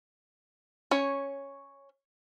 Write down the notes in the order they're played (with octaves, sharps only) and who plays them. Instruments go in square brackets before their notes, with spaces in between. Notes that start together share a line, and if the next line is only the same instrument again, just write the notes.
[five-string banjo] C#4 C#5